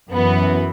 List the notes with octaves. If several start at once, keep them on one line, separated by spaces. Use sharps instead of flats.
F#2 E3 B3